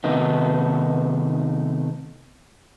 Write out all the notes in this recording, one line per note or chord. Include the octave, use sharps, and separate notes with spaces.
C3 D#3 A3 B3 D#4